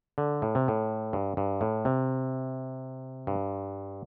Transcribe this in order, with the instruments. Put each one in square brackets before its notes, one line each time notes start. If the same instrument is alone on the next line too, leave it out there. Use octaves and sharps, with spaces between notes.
[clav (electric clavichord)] D3
A2
C3
A2
G2
G2
A2
C3
G2